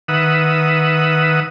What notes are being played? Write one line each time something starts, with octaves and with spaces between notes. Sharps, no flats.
D#3 B4 E5 F#5 D#6